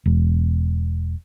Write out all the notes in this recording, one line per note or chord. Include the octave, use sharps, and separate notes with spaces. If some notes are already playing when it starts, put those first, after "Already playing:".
E1